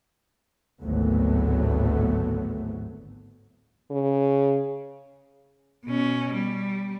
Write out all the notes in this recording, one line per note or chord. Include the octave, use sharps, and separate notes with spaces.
G#1 D2 A2 F#3 A3 B3
C#3
B2 C#4
G3